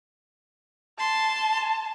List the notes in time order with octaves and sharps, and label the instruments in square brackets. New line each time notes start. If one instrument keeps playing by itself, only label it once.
[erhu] A5 [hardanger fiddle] C6